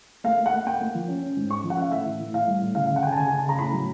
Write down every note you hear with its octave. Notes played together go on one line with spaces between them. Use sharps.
A#3 F5
A#3
F#5
A#3
A#3 G5
A#3
F3
C#4
C#4
G#2
C#4 C#6
F3
F#5
C#4 E5 F5
A2 E5
E3
A2
A2 F5
G3
A2
C#3 F5
C#3 F5
F#5
C#3 G5 G#5
A5
C#3 G#5
C#3 G#5
A5
C#3 A#5
A2 B5
F#3